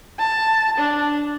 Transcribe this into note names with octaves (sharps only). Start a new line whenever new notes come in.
A5
D4